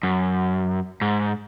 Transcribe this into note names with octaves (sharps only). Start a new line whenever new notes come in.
F#2
G#2